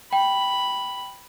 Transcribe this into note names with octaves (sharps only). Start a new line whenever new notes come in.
G5 B5